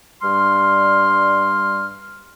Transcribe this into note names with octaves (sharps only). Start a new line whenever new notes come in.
G2 G3 C6 F6